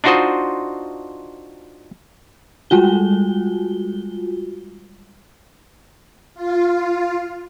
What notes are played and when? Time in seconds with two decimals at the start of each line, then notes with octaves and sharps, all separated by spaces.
0.04 D4 D#4 F4 F#4 C5 D#5
2.70 G3 G#3 F4 F#4 G7
6.35 F4